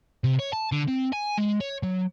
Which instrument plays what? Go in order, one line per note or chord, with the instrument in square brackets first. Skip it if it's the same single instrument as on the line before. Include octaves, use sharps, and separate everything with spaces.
[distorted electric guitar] C3
C#5
A5
D3
C4
G#5
G#3
C#5
F#3